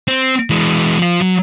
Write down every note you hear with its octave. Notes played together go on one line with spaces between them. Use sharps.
C4
E3 G#3
F3 F4
F#3